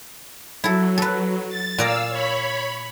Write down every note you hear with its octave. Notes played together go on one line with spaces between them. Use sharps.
F#3 E4 A4
A4 B4
A6
A#2 D5 F5 A#5 E6
C#5 B5